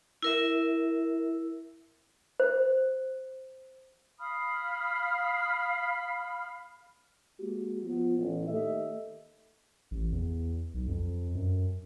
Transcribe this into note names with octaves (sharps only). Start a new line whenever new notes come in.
E4 A#4 E5
C5
F5 B5 D#6 F6
G#3 A#3 F#4 G4
F3 B3 F4
A1
D#2 A3 A4 D#5 E5
A1
E2
B1
F2
F#2